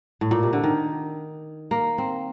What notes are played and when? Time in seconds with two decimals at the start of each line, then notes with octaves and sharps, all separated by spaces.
0.21 A2
0.31 A#2
0.43 C3
0.53 D3
0.64 D#3
1.71 A#3
1.98 C4